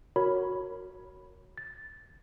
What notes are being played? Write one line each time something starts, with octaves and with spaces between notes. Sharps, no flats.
F#4 A#4 C#5 B5
A6